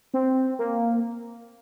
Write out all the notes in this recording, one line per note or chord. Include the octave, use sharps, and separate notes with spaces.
C4
A#3